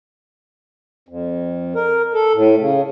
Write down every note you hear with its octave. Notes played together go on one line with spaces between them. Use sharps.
F2
A#4
A4
A2
C#3